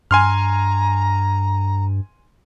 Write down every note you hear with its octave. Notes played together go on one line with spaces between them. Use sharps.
G2 G#5 A#5 C6 F6